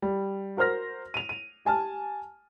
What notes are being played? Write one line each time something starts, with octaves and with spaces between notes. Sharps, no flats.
G3
F#4 A#4 C5 F6 A#6
D#7 F7
D#7
G4 G#5 A5 F6